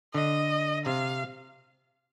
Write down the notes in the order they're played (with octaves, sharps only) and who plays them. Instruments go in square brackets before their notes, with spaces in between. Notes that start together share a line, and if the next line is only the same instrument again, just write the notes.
[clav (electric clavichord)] D3 [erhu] D#5
[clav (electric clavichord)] C3 [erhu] F5